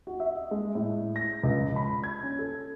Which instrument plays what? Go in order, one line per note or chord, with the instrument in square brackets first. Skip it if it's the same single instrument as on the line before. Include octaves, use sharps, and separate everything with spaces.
[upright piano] F#4
E5
D#5
G#3
A2
A#6
C#2
B5
G#6
C#4
A4